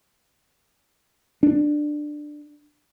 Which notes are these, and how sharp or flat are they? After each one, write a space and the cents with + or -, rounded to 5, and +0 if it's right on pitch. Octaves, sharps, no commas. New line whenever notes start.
D4 +15